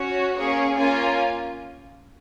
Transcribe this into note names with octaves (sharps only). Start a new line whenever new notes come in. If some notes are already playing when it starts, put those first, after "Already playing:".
Already playing: C#4 F#4 C#5
A#3 C#4 G#4 C#5
A#3 C#4 F4 G#5